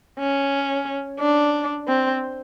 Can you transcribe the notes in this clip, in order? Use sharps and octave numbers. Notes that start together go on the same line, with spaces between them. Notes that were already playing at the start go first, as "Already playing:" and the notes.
C#4
D4
C4